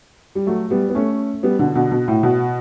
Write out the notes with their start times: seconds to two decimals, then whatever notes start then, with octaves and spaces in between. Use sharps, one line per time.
0.35 G3
0.47 F#3 A3
0.71 G3 B3
0.89 B3
0.95 A3 C#4
1.43 G3 B3
1.59 B2 D3
1.75 B2 D3
1.91 B2
2.08 A2
2.23 B2